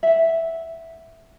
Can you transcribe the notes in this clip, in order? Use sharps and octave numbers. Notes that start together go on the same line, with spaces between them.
E5 F#5